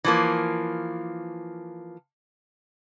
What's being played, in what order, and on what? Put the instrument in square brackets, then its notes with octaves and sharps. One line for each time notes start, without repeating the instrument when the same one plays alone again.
[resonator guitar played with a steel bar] E3 F3 A#3